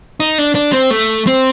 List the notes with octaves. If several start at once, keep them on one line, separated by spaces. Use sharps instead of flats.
D#4
D4
D4
C4
A3
C4